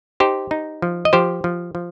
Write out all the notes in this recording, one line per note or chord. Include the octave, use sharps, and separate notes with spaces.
D#4 G4 C5
D#4
F3
D#5
F3 G4 C5
F3
F3